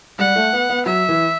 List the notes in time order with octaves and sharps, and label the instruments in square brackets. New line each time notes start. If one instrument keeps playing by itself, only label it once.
[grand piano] G3 [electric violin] F#5
[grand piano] A3
B3
B3
[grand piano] F#3 [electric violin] E5
[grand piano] E3